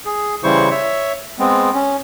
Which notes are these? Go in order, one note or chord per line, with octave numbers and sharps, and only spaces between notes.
G#4
C#3 E3 G3 E4 C5 C#6
C#5 E5
G#3 B3 C4
C#4